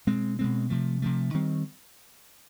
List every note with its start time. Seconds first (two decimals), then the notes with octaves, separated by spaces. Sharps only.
0.07 B2 G#3 C4
0.39 B2 G#3 C4
0.70 C3 F3 A3
1.02 C3 F3 A3
1.34 D#3 G3 C4